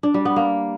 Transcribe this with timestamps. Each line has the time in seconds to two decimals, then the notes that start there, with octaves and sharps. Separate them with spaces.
0.03 D4
0.14 G3
0.25 B3
0.36 A#3